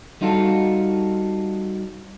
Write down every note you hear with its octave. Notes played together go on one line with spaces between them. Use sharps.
G3 D#4 F4 F#4 A4